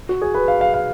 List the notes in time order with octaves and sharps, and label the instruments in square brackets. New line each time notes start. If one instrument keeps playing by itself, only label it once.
[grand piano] F#4
G#4
B4
F5
F5
F5